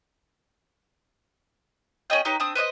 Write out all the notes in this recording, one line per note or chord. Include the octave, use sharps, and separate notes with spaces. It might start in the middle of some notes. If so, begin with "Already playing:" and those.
C#4 G#4 D#5 G5
D#4 G4 B4 C#5
C4 D4 D#6
B4 C5 D5 D#5